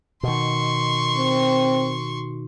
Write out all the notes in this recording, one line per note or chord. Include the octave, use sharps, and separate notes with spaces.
B2 D#3 C6 C#6
C4